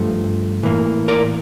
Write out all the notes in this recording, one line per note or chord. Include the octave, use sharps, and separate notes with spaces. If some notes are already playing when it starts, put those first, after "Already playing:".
Already playing: G2 F3 A3
A2 E3 A#3
A#4 D5